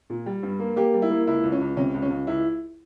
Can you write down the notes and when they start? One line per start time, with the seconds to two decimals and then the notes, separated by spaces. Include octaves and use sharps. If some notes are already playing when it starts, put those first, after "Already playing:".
0.10 A#2
0.26 G3
0.43 G2
0.59 A#3
0.76 A#3 G4
0.94 G3
1.02 E4
1.10 A#3
1.27 C#2 E4
1.43 C#2
1.52 C#4
1.61 C#2
1.77 C3 C#4
1.94 C#2
2.02 C#4
2.10 C#2
2.27 C#2 E4